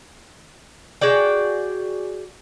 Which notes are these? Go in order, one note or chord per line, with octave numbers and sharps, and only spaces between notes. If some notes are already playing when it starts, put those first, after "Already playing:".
F#4 G#4 D5 G5